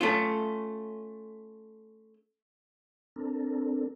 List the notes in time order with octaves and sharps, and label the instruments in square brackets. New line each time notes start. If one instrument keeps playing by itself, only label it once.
[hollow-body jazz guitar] A3 C#4 F4
[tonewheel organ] C4 D4 A4 A#4